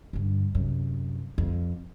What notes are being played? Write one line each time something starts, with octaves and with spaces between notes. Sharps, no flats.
G2 D3
F#2 C3
F2